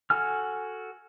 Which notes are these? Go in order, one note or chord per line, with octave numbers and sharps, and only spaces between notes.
F#4 A4 G#5 F6